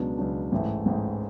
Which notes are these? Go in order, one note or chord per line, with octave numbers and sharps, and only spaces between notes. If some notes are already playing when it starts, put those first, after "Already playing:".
Already playing: C#2 B2 F#3 B3 D4
C#2 B2 F#3 B3 D4
A1 G#2 E3 A3
A1 G#2 E3 A3